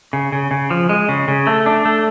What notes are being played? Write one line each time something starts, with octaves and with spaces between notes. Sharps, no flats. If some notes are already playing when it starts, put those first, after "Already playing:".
C#3
C#3
C#3
F3
G#3
C#3
C#3
A3
D4
A3